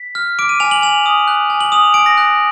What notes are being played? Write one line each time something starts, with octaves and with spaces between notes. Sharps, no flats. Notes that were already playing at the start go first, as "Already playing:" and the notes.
Already playing: B6
F6
D6 D7
D#7
G#5 F7
F#7
G#5 F7
D#6
F#6
G#5
F#7
D#6 F7
G#5 D7
A#6
F#6